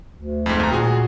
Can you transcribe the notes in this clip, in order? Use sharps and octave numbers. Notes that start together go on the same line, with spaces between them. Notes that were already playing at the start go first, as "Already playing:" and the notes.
D2
F2 G#2
D#2 A#5
A#2 F#4 G#4